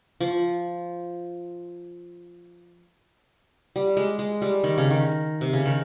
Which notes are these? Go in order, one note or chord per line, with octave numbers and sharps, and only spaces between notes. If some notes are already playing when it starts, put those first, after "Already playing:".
F3
G3
G#3
G#3
G3
D#3
C#3
D#3
C3
C#3
D#3